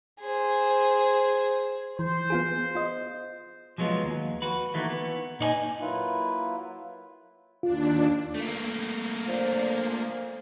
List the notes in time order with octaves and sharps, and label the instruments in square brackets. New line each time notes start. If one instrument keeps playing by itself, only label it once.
[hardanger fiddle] G#4 C5
[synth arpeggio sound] E3 [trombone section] C5
[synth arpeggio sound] B3 F4 G#4
F4 D#5
[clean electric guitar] F3 F#3 G#3 B3 F4
D#2
F#4 B4
D#3 E3 A3 A#3
B3
A#2 D#4 D5 G#5
[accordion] F#3 A#3 E4 F4 B4
[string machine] D#2 D4 [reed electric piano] F4
[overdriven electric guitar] A3 A#3
[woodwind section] A#2 D3 F3